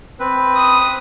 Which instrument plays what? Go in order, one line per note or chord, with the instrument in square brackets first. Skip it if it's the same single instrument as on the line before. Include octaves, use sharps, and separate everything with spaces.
[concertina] C4 B4
[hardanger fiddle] D#6